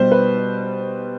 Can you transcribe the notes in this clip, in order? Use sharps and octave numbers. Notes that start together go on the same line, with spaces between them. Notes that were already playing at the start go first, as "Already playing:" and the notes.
Already playing: B2 G3 C5
B4